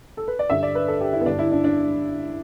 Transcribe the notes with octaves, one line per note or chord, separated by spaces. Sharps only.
A4
B4
D5
G2 D3 E5
D5
B4
A4
G4
E4
B3
G2 D3 D4
E4
D4
D4